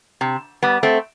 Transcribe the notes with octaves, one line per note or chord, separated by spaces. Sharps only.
C3
G3 B3
A3 C4